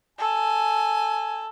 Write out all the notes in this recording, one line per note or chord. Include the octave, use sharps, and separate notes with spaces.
A4 G#5